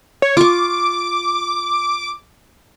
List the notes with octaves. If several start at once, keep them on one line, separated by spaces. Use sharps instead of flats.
C#5
F4 C#6 D6